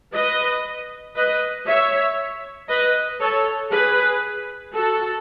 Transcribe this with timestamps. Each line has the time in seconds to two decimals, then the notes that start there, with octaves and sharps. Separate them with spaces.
0.13 B4 D#5
1.16 B4 D#5
1.67 C#5 E5
2.69 B4 D#5
3.20 A4 C#5
3.71 G#4 B4
4.73 F#4 A4